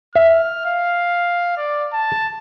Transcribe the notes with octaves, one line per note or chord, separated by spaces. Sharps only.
E5 F6
F5
D5
A5